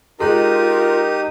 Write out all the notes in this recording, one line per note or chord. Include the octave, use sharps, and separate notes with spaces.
G#3 D#4 F4 G4 A#4 D#6